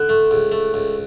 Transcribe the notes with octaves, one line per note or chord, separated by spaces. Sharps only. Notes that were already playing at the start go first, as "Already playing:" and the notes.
Already playing: D3 F#6
A3
C#2
A3
C#2